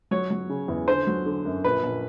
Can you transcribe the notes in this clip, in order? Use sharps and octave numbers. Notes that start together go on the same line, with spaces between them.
F#3 C#5
F#3
C#3
E2
D3 C5
F#3
D3
F#2
A#1 B4
A#1